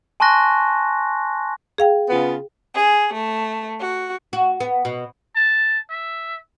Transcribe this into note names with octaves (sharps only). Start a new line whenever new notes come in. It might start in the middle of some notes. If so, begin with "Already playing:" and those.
G#5 A5 C6 C#6 F#6 A#6
G#4 F5 G5
C#3 B3 F4
G#4
A3
F#4
F#4
B3
B2
A5
E5